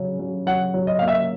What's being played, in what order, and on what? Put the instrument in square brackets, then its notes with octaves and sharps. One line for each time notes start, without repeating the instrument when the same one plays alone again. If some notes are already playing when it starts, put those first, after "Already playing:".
Already playing: [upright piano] C#3 F#3
F#3
[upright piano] F#3 [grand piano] F#5
[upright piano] F#3
[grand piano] D#5
[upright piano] A#3 [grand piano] F5
[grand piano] E5